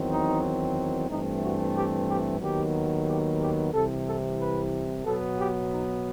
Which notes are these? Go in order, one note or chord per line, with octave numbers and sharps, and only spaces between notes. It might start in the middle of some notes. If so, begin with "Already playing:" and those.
Already playing: E2 D#3 F#3 C4
D#4
G2 E3 A3 C4 D#4
F#4
G4
G4
D#2 D#3 F#3 B3 G4
G4
G4
C2 C3 E3 A4
A4
B4
B2 F#3 B3 A4
G4
D#4